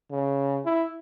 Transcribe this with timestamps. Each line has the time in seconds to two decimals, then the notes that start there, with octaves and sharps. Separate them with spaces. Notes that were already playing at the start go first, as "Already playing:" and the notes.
0.11 C#3
0.66 E4